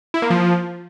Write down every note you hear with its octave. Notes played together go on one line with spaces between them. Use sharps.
E4
A#3
F3